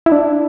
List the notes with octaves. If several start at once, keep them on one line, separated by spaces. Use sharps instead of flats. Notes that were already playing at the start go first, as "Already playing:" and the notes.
E4
D4